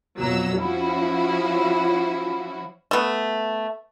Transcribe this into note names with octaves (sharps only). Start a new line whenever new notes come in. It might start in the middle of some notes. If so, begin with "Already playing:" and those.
F2 B2 F#3 A#5 E6
F3 C#4 E4 F#4
A3 B3